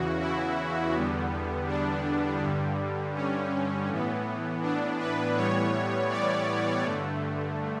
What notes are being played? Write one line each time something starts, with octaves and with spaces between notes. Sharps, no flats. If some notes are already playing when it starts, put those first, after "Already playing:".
Already playing: E2 C#3 E3 F#4
E4
E2 D3 G3 B3
D4
G2 D3 G3
C#4
A2 E3 B3
D4
B4
A2 E3 G3 B3 C#5
D5
G2 D3 A3